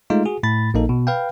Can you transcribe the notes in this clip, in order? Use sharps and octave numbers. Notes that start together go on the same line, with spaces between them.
G#3 A3 D#4 F4
F#4 G#4
A2 B5 A6
A#1 A#3 D#4 A4
B2
B4 F5 G5